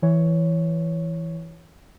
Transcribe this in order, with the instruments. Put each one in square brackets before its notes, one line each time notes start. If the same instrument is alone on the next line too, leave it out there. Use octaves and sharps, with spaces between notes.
[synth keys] E3 C#5